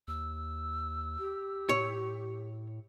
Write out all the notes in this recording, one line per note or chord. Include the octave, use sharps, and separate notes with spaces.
D#2 E6
G4
A2 C#5